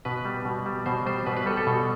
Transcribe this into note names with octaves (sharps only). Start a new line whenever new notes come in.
B2 B4
G3
B2
G3
B2 C5
G3 C5
B2 B4
B4
G3 A4
A4
B2